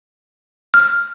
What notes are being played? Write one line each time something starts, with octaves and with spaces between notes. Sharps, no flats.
F6